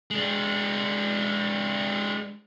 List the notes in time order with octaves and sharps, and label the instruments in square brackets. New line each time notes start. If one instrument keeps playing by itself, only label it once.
[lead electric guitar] G#3 D4